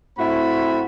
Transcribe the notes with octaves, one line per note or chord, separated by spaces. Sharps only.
A2 C4 F#4 E5 B5